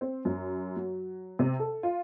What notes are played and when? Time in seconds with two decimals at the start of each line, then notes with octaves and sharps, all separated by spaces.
0.01 C4
0.25 F#2
0.76 F#3
1.39 C3
1.59 A4
1.83 F4